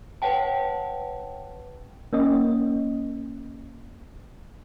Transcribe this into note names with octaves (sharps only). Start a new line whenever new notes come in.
B4 C#5 F#5 G5 A5
A#3 C#4 D#5